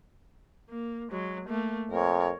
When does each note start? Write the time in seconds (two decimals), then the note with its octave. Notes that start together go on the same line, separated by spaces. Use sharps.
0.70 A#3
1.12 F#3 G#3
1.45 A3 A#3
1.91 F2 A#4 C#5